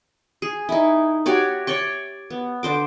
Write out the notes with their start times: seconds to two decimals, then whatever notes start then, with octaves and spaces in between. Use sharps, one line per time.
0.42 G#4
0.69 D#4 E4
1.26 F#4 G4 C#5 D5
1.67 C#5 D5 G5 C#6
2.30 B3
2.63 D3 C5 D6